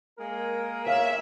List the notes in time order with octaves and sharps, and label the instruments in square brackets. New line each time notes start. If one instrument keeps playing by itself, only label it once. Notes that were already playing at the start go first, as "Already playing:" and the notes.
[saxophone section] G#3 A#3 A#4
[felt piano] C#5 F5 [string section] E5